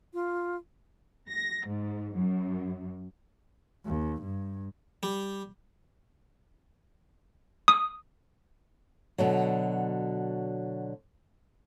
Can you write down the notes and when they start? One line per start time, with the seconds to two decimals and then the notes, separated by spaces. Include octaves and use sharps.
0.14 F4
1.29 A#6
1.67 G#2
2.14 F#2
3.86 D#2
4.22 G2
5.03 G3
7.68 D#6
9.18 B2 D3 F#3